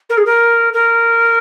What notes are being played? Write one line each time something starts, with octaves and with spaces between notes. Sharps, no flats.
A#4
G#4
A#4
A#4